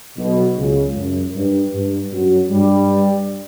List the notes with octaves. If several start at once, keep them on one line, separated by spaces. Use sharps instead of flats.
B1 B2
C#2 C#3
F#2
G2
G2
F#2 F#3
G2 G3